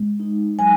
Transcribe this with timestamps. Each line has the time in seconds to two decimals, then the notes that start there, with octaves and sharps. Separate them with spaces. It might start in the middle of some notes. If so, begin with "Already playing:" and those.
Already playing: G#3
0.20 D#4
0.59 F#3 G#5